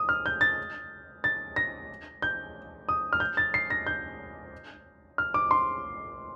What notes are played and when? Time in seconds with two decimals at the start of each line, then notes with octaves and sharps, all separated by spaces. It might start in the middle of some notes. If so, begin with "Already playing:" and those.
Already playing: D#6
0.09 F6
0.26 G6
0.41 A6
1.24 A6
1.56 A#6
2.22 G6
2.89 D#6
3.13 F6
3.20 G6
3.37 A6
3.54 C7
3.70 A#6
3.87 G6
5.18 F6
5.34 D6
5.51 C6